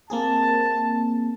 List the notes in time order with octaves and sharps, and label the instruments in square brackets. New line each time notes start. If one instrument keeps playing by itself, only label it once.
[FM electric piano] A#3 C4 G#4 [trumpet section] A5